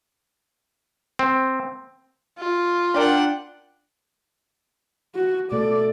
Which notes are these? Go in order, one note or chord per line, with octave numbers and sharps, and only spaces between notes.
C4
F4
D4 A#4 D5 F#5 G5 B5
F#4
B2 A3 A4 D5